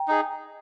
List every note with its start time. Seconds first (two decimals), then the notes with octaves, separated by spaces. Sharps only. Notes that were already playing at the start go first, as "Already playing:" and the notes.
Already playing: G5 A#5
0.08 D#4 G#4